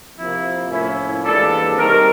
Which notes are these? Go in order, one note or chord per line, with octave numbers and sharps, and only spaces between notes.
C3 F3 A#3 E4
A2 F3 A#3 C#4 E4
G#2 E3 G3 A#3 D4 A4
C3 D#3 G3 C4 A#4